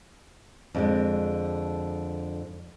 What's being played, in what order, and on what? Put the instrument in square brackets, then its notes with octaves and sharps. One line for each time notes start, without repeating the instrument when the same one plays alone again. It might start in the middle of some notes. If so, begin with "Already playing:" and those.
[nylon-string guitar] F2 D3 G#3